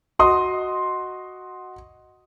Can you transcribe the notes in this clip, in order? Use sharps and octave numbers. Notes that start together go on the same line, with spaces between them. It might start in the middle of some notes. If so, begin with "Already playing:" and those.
F#4 D#5 C6 D#6